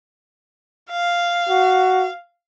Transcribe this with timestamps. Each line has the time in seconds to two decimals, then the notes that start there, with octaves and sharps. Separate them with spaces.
0.91 F5
1.49 F#4